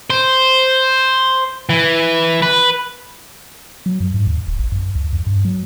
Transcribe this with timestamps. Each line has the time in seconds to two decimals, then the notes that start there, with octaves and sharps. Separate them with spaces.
0.10 C5
1.69 E3
2.43 B4
3.86 F#3
4.00 F#2
4.14 G#2
4.27 D#2
4.47 D#1
4.59 A1
4.72 F#2
4.95 C#2
5.13 F2
5.27 G2
5.45 F#3